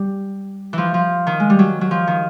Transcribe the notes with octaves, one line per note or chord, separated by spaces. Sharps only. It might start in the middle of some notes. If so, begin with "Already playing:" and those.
Already playing: G3
E3 F3
F3
D#3
G#3
G3
F#3
F#3
F3
D#3